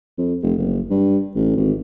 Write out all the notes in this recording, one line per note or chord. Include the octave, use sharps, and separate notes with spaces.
F2
F1
F#1
G2
A1
G#1